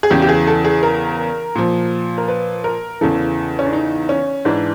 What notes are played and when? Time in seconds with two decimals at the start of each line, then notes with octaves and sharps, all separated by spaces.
0.03 G#4
0.10 E2 C#3 E3 G4
0.22 G4
0.29 G#4
0.47 A4
0.64 G#4
0.83 A#4
1.55 A#2 F3
2.18 A#4
2.28 B4
2.64 A#4
3.01 E2 C#3 E3 A4
3.59 C#4
3.66 D4
3.73 D#4
4.09 C#4
4.45 G#2 E3 D4